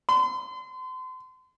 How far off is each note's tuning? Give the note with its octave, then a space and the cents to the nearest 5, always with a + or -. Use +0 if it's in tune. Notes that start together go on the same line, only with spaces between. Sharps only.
C6 -35